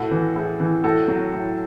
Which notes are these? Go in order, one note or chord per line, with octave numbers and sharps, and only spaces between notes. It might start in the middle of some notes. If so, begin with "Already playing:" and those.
Already playing: A2 F#4 A4
E3
A2 G#4
E3
A2 F#4 A4
F#3
A2